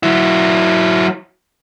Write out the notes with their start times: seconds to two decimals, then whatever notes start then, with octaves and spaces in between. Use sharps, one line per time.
0.03 F#3 E4